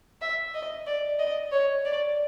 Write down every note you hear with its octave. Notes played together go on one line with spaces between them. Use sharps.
E5
D#5
D5
D#5
C#5
D5